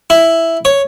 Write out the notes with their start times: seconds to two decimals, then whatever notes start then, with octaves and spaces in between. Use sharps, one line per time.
0.10 E4
0.65 C#5